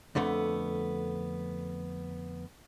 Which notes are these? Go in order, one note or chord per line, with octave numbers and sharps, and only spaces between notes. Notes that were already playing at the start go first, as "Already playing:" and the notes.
F2 D3 A3 B3